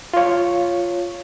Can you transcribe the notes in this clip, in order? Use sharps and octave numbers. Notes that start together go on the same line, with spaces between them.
F4 C#5